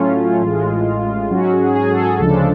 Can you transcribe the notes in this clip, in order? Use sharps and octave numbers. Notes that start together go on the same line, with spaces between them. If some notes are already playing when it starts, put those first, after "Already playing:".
Already playing: A2 F#3 A3 C#4 F4
A1 A2 G#3
G#2 F#3 C#4 F#4
G#4
G#4
A4
G#4
D2 C#3 F3 G#3 D4 A4